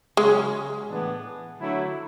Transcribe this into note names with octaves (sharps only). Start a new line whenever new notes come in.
C#3 F#3 G#3 C#4
A2 E3 B3 D4 G#4
D3 F#3 A3 E4